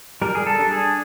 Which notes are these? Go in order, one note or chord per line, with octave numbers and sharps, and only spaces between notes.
G3 A#4
G#4
A4
D4
G#4